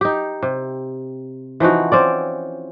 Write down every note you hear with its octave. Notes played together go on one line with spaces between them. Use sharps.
D#4 G4
C3
E3 F3 D#4 F#4
C4 C#4 D5